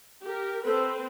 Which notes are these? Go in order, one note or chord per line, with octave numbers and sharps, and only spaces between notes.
G4 A#4
C4 A4 B4 C5